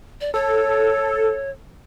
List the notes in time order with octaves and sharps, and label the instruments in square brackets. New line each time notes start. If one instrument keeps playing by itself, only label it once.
[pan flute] D5
[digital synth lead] A4 [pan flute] C#5